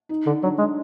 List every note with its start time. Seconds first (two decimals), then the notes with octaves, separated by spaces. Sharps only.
0.09 D#4
0.27 D3
0.42 F#3 D4
0.58 G#3